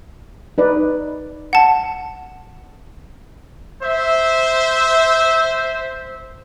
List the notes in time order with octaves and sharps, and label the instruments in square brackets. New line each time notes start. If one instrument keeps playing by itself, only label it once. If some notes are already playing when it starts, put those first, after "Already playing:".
[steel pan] D#4 B4 D5
[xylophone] F#5 A5
[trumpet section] C5 E5